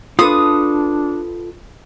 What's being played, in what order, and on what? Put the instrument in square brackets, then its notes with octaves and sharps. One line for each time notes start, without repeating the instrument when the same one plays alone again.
[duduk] D4 [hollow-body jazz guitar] F4 A4 B4 [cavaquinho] D#6